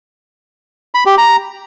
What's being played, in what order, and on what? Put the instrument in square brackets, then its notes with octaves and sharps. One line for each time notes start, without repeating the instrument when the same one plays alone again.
[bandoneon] B5
G4
A#5